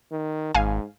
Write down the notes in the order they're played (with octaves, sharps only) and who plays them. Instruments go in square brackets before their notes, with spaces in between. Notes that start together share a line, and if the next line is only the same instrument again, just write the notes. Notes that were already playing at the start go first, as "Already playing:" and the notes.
[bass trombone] D#3
[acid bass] G#1 [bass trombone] G#2 [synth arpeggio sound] F5 G#5